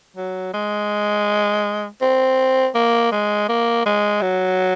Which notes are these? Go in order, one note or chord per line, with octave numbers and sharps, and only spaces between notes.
F#3
G#3
C4
A#3
G#3
A#3
G#3
F#3